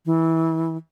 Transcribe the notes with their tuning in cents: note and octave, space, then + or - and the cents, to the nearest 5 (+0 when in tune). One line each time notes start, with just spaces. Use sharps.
E3 -20